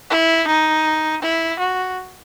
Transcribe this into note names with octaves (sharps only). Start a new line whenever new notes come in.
E4
D#4
E4
F#4